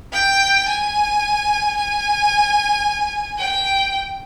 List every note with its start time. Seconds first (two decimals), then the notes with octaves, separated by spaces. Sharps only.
0.13 G5
0.68 G#5
1.76 G#5
3.39 G5